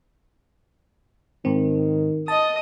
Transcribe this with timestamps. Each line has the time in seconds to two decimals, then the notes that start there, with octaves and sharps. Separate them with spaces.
1.45 G#2 D#3 C4
2.28 D#5 A5 D#6